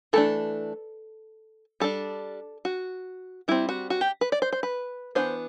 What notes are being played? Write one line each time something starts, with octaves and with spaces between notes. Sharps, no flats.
E3 A3 D4 A4
G3 D4 A4
F#4
G3 C4 E4
F#4
F#4
G4
B4
D5
C5
C5
B4
E3 B3 D4 C5